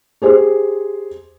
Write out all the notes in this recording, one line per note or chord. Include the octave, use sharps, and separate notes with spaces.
G4 G#4 C5